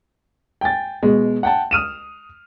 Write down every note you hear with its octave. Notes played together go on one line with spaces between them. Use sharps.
G5 G#5 A6
B2 G#3
F#5 G5 A5
D#6 F6 D#7 E7